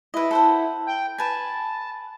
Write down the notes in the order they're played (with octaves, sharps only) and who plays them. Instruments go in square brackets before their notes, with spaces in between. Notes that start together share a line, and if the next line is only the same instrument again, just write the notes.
[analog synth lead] E4 [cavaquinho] B4 D#5
[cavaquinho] A4 C5 F#5
[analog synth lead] G5
[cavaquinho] B4 G#5 [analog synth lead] A5